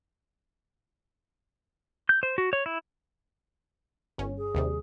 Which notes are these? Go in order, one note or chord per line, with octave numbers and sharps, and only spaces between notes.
G6
C5
F#4
C#5
E4
G1 C#4
G#4
D#2 C3 G3